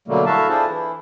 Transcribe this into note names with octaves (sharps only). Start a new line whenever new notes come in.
B2 D3 F#3 G3 A3 A#3
E4 F#4 A4 E5 F5 A5
D4 E4 F4 G#4 A4 C5
E3 E4